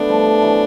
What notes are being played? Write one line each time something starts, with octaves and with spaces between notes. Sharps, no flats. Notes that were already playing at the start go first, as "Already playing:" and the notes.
Already playing: A3 B3 D4
F3 G3
F3
E3 F#3